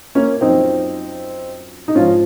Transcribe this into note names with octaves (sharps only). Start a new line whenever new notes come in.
A#3 C#4
F#2 F3 C4 D#4
D#4
G#2 F3 C#4 F4